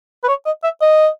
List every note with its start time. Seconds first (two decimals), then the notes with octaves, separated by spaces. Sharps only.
0.24 B4
0.29 C#5
0.46 D#5
0.64 E5
0.81 D#5